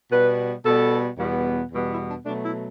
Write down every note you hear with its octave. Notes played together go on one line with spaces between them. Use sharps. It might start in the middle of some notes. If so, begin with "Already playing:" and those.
B2 G3 B3 B4
B2 G3 B3 A4
E2 B2 G3 B3
E2 B2 G3 B3
E4
D4
B2 F#3 A3 D4
E4